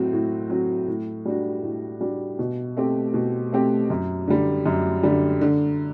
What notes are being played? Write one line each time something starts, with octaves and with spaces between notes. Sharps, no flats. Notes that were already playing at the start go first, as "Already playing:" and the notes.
Already playing: A2 F#3 C4 F#4
A2
F#3 C4 F#4
A2
G3 D4 F#4
A2
G3 D4 F#4
B2
A3 C4 G4
B2
A3 C4 G4
F#2
D3 G3
F#2
D3 G3
D3